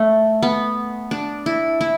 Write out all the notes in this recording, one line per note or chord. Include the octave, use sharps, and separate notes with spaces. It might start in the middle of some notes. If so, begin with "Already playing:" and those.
Already playing: A3
B3
D4
E4
E4